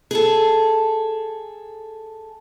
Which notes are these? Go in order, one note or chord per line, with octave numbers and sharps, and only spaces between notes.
G#4 A4